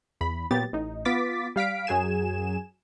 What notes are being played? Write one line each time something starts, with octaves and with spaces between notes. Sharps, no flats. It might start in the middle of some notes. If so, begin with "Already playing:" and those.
E2 B5
A#2 F#3 B3 G4 A6
A1 D#4
B3 F4 D6 A6 B6
G3 F5 B6 D7
F#2 F#3 G#4 G#5 E7